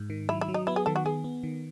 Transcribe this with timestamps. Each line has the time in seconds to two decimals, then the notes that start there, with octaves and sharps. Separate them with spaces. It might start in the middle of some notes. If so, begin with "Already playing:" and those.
Already playing: G#2
0.10 D#3
0.29 F#3 E4
0.41 E4
0.48 F#3
0.54 D#4
0.67 B3 E4
0.76 G#4
0.86 D#3 A4
0.96 F#4
1.05 B3 G#4
1.24 B3
1.43 D#3